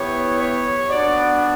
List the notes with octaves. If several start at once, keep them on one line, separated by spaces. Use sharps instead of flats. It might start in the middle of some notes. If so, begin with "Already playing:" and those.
Already playing: B3 E4 G4 C#5
C#5
B3 D4 F#4 D5